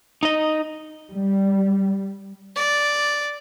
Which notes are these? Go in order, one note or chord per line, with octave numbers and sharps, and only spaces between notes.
D#4 D#5
G3
D5